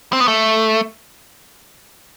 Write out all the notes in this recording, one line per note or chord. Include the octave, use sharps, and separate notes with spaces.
C4
B3
A3